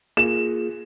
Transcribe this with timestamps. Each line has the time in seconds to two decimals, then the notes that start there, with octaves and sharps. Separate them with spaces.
0.17 A#3 F4 G#4 E7